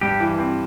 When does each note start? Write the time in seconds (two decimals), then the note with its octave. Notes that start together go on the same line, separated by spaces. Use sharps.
0.01 G2 G4
0.20 E3
0.38 C4